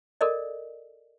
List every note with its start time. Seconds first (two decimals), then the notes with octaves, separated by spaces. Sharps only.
0.21 A4 A#4 D5 D#5